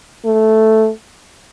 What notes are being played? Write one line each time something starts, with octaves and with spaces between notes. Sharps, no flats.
A3